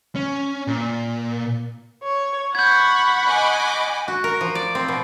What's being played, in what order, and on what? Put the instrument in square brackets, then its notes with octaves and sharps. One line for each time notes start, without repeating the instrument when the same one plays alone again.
[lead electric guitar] C#4
A#2
[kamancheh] C#5
[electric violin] F#5 B5 [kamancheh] C#6 [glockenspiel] G6 G#6
[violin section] D#5 G#5 D6
[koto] F#4
A#4
F3
D5
C4
B2